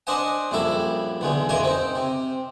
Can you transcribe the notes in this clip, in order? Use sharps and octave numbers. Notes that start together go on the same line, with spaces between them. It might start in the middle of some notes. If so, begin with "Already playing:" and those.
D4 C5 D#5 F#5 G#5
A#1 F#2 G3 E4 A4
B1 E2 D3 G#3
F#2 A#2 E3 G#3 A#4 G#5
C4 D#4
C3